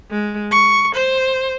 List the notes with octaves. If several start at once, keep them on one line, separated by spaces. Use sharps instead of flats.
G#3
C#6
C5